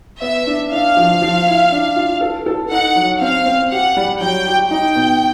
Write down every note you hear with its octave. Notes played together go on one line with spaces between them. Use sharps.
B3 E5
D4
D4 F5
F3
F3
E4
D4
F4
A4
A4
D#4 F#5
F#3
C4 F5
C4
G4 F#5
G3
F#3 G5
G4
D#4 G5
B2